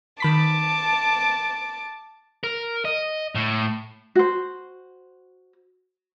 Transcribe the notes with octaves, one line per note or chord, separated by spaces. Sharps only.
D#3 A5 B5 D6 B6
A#4
D#5
A2
F#4 C5